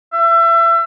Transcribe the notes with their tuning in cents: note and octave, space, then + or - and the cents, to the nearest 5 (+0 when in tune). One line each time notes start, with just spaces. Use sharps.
E5 +30